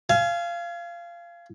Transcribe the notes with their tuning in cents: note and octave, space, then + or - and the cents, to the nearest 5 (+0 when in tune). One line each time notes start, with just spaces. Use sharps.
F5 -20 G#5 +25